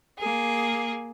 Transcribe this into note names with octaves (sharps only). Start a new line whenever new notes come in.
A#3 G#4